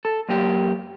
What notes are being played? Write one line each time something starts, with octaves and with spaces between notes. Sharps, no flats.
A4
F#2 A#3 G4